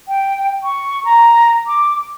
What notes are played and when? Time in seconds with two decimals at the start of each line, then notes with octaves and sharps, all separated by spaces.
0.08 G5
0.64 C#6
1.05 A#5
1.67 D6